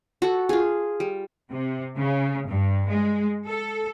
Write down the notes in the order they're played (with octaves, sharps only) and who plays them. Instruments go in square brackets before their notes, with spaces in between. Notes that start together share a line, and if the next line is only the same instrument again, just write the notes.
[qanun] F#4 A4
F4 G#4
G3
[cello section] C3
C#3
G2
G#3
A4